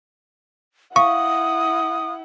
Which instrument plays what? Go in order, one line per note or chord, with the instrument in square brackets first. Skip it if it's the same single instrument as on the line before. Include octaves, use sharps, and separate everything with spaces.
[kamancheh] E4 F#5 [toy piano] F5 [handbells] C#6 [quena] D#6